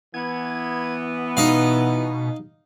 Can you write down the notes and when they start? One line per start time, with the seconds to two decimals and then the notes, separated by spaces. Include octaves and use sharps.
0.14 E3 B3 G#6
1.37 B2 D#4 D#5 F5